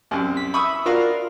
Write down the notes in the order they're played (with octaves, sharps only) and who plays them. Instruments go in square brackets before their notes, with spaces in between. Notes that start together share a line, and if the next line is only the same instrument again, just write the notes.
[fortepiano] C2 F#2
[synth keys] B6
[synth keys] E5 B5 [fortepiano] C#6 D#6
[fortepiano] D4 F#4 F5 [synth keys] F4 A#4